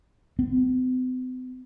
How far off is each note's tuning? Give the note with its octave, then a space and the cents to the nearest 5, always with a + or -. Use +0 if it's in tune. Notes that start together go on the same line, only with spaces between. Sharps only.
C4 -45